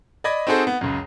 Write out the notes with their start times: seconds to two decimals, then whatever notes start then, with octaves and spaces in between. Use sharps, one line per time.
0.24 D5 D#5 B5 G#6 A#6
0.47 C4 D#4 F#4 G#4 A4 C5
0.67 B3
0.81 C#2 F#2